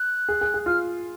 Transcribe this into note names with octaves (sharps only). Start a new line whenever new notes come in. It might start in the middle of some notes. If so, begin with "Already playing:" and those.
Already playing: F#6
G#4
G#4
G#4
F4 F6